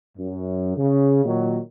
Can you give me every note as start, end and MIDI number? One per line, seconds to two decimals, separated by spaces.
0.17 0.74 42
0.77 1.22 49
1.25 1.58 46
1.25 1.58 51
1.25 1.58 54